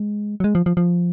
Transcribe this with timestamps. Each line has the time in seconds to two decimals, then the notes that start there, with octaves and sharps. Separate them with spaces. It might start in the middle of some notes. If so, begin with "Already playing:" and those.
Already playing: G#3
0.40 F#3
0.44 G#3
0.55 F3
0.66 F3
0.77 F3